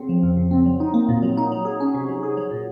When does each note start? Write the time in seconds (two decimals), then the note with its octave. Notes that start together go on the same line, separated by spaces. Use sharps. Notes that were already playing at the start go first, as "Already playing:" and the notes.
Already playing: C#3 C4
0.09 F3
0.23 F2
0.37 C#3
0.51 C4
0.66 F#3
0.80 D#4
0.94 A#3
1.09 A#2
1.23 F#3
1.37 D#4
1.52 F#3
1.65 G#4
1.80 C#4
1.94 C3
2.09 F#3
2.23 G#4
2.37 F#3
2.51 A#2